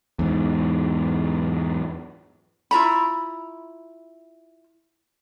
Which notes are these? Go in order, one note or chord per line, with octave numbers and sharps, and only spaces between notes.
E2 G#2
E4 F4 A#5 B5